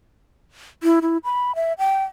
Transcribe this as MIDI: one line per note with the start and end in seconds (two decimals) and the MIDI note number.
0.83 1.00 64
1.02 1.18 64
1.24 1.55 83
1.55 1.73 76
1.79 2.04 79